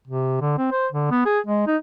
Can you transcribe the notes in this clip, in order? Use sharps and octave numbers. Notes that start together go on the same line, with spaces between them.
C3
D3
C4
C5
D3
B3
G#4
G#3
D#4